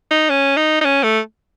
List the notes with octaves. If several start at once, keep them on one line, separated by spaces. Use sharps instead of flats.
D#4
C#4
D#4
D#4
C#4
A3